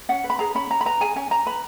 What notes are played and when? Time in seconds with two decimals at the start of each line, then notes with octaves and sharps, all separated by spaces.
0.09 C#4 F#5
0.24 B4
0.30 B5
0.39 G#4 A#5
0.55 C#4 B5
0.70 C#4 A#5
0.81 B5
0.86 B4 A#5
1.00 G#4 G#5
1.16 C#4 G#5
1.31 C#4 A#5
1.46 B4 B5